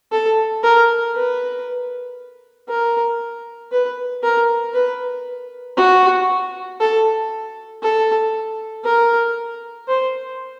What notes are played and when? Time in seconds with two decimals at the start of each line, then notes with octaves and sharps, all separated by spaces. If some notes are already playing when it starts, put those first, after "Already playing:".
0.12 A4
0.63 A#4
1.15 B4
2.68 A#4
3.72 B4
4.23 A#4
4.74 B4
5.77 F#4
6.80 A4
7.82 A4
8.85 A#4
9.88 C5